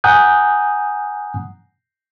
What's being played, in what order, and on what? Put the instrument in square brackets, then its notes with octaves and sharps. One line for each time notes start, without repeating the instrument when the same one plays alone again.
[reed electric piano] F#5 G#5 A#5 D#6 F#6 G6